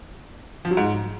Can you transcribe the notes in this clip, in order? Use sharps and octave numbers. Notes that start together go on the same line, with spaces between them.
F3
F#3
G#2